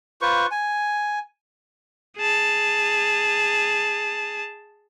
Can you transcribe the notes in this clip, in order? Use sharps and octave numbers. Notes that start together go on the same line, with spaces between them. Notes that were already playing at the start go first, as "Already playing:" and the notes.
F4 B4 C5 C#6
G#5
G#4 A5